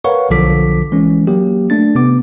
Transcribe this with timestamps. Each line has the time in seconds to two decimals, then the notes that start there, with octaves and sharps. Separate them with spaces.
0.04 A#4 B4 C#5 F5 F#5 C#6
0.30 B1 D3 F3 A4 D6 B6
0.92 E3 G#3 C#4
1.27 F#3 A#3 G4
1.70 A3 D4 A6
1.95 C3 B3 D6